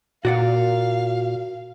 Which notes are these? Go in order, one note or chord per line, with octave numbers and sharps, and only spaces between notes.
A#2 F#4 D5 F5 F#5